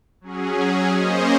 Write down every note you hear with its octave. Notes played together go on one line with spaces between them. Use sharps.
F#3 C#4 G#4
A#3 C#4 G#4 C5 D#5